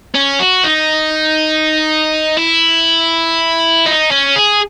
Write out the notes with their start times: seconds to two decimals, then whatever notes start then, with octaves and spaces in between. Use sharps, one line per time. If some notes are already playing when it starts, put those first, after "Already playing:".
0.15 C#4
0.40 F#4
0.65 D#4
2.37 E4
3.86 D#4
4.11 C#4
4.36 G#4